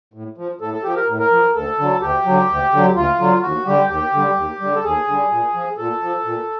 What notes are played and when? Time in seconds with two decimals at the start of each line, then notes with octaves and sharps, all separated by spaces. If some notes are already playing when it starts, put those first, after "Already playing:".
0.14 A2
0.38 F3
0.61 A2 A4
0.73 A4
0.84 F3 G4
0.96 A#4
1.08 A2
1.19 A#4
1.31 F3
1.55 D2 A4
1.79 D3 F#3
2.01 D2 G4
2.25 D3 F#3
2.49 D2
2.73 D3 F#3
2.95 D2 F4
3.20 D3 F#3
3.42 D#2 F#4
3.66 D3 G3 G4
3.89 D#2 G4
4.13 D3 G3
4.36 D#2
4.60 D3 G3
4.75 A4
4.84 D#2 G#4
5.08 D3 G3
5.31 A#2
5.54 F3
5.77 A#2 A4
6.02 F3
6.25 A#2